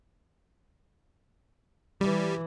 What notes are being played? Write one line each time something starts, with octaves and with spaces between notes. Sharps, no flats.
E3 G3